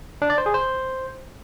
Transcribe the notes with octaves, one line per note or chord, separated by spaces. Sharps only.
D4
D5
C5
G#4
C5